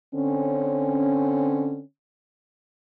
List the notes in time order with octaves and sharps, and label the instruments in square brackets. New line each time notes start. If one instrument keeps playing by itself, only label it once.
[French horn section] D3 C4 C#4